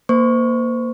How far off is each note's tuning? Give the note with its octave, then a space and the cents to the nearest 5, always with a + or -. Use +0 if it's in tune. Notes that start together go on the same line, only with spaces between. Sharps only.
A#3 +0 C5 -30 C#6 +0